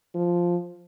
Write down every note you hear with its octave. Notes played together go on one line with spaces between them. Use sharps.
F3